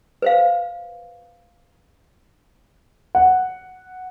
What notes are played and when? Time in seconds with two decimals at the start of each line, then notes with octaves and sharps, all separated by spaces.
0.22 B4 C5 F5
3.15 F#5